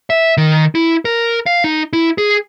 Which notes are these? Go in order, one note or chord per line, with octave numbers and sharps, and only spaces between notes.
E5
D#3
E4
A#4
F5
D#4
E4
G#4